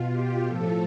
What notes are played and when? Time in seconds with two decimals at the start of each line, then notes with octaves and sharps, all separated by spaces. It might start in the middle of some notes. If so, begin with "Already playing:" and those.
Already playing: B2 F4
0.11 G4
0.45 A2 F3 A4